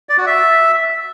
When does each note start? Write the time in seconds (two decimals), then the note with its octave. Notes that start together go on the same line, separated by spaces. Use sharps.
0.09 D5
0.18 F#4
0.26 E5